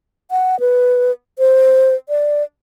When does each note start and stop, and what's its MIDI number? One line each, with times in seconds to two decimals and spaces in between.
0.31 0.59 78
0.60 1.11 71
1.39 1.94 72
2.09 2.43 74